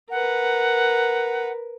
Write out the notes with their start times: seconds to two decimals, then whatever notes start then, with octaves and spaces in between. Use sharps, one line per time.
0.10 A#4 B4 F#5